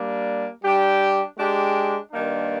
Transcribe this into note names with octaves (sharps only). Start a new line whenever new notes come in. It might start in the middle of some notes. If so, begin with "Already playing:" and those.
Already playing: G3 A#3 D4
G3 D4 G4
G#3 D4 G4
G2 D#3 A#3 D4